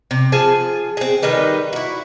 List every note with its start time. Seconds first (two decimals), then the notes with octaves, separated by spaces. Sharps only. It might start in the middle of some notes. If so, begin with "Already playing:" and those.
0.11 C3
0.32 F3 G#4 G#5 A5
0.97 C4 G#4
1.22 D#3 G3 D#4 B4
1.73 E4 F#4